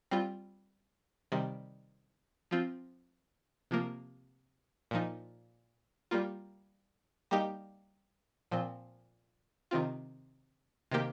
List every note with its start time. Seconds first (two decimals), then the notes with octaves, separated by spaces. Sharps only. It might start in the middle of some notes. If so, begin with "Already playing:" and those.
0.11 G3 C4 F4
1.32 C3 D#3 G3
2.51 F3 C4 F4
3.71 C3 F3 A#3
4.91 A#2 F3 D#4
6.11 G3 A#3 F4
7.31 G3 A#3 D#4 G4
8.51 A#2 F3 C4
9.71 C3 D#3 C4 F4
10.91 C3 D#3 A#3 G4